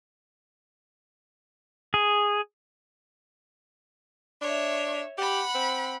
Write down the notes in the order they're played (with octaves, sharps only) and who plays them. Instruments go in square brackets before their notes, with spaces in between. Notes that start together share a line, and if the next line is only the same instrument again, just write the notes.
[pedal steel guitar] G#4
[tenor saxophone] D4 [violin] C#5 E5
[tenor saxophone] G4 [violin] F#5 B5
[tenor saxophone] C4